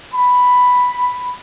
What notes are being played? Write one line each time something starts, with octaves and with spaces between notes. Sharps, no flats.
B5